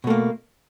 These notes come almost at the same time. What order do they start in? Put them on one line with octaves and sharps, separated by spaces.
B2 A3 A#3